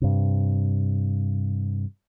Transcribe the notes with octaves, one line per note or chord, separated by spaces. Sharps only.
G2 C3